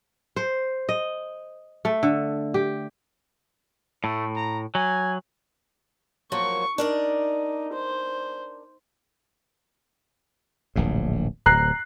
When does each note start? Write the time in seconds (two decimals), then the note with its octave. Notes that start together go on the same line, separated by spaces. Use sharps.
0.36 C5
0.89 D#5
1.85 A3
2.03 D3
2.54 G4
4.04 A2 A3
4.36 A#5
4.75 F#3 G#5
6.32 F3 F#3 A#3 C#6
6.78 D4 D#4 A#4 D5
7.74 C5
10.76 D1 A#1 G#2
11.46 D1 A#5 F#6 C7